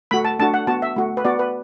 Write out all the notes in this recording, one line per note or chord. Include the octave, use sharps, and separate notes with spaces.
A3 F#4 B5
A5
A3 D4 F#4 A5
F#5
B3 F#4 A5
E5
A3 F#4
B4
B3 F#4 D5
B4